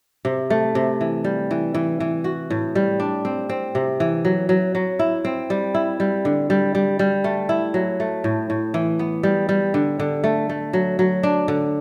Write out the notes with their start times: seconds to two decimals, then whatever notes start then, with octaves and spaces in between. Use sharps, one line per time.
0.25 C3
0.50 A3
0.75 C3
1.01 E3
1.24 G3
1.51 E3
1.74 E3
2.00 E3
2.24 F#4
2.50 A2
2.75 G3
3.00 D4
3.25 C4
3.49 C4
3.75 C3
4.00 E3
4.25 F#3
4.49 F#3
4.75 F#3
4.99 E4
5.25 C4
5.50 G3
5.75 E4
6.00 G3
6.25 D3
6.50 G3
6.75 G3
6.99 G3
7.24 A3
7.49 E4
7.74 F#3
8.00 A3
8.24 A2
8.50 A2
8.74 E3
8.99 B3
9.23 G3
9.49 G3
9.74 D3
10.00 D3
10.24 A3
10.49 A3
10.73 F#3
10.99 F#3
11.23 D4
11.48 D3